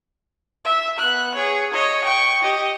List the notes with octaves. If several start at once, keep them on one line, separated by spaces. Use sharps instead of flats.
E5
B3 F#6
G#4 C#5
C#5 D#5
G5 C#6
G4 D#5